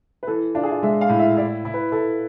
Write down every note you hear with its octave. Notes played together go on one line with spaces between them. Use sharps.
B4
E3 A4
D4 F4
G#4
F4
G#3 E5
F5
A2
E5
E4 D5
E4
B4
E4 A4